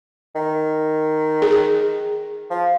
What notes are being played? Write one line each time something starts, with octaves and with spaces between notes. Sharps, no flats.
D#3
G#4
F3